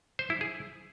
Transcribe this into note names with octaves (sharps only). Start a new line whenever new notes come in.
C5
E4
G#4